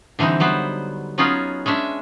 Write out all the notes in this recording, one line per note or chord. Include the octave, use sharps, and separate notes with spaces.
D3 E3 G3 C4 D#4
F#3 G3 B3 C5
F#3 B3 C#4 D#4 F4 G#4
G#3 C#4 D4 E5